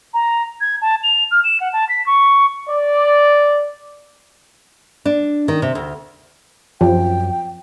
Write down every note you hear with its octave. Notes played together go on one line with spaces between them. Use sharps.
A#5
G#6
A5
F7
F6
E7
F#5
A5
B6
C#6
D5
D4
D#3
C3
D2
F#2 F3 G5